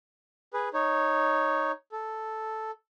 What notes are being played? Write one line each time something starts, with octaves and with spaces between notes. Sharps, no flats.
G#4 B4
D#4 C#5
A4